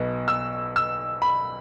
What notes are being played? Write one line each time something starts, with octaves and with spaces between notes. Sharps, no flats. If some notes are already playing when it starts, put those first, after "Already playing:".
Already playing: B1 B2 B3
E6
E6
B5